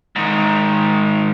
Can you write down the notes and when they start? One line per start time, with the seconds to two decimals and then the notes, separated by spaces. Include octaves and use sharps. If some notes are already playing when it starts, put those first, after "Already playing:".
0.16 G#2 D#3